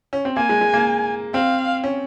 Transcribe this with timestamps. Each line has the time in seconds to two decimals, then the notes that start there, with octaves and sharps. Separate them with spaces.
0.13 C#4
0.25 C4
0.37 A#3 G#5
0.49 G#3
0.61 G#3
0.74 A#3
1.34 C4 F5
1.84 C#4